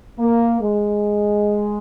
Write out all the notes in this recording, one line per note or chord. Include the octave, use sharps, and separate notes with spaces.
A#3
G#3